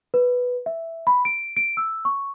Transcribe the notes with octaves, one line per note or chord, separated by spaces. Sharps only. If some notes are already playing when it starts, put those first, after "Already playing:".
B4
E5
B5
D7
D7
E6
C#6